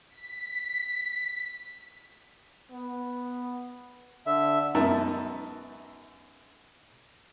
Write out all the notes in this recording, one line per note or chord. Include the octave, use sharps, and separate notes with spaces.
B6
B3
D3 E5
F#2 B3 D#4 A#4 E5 A5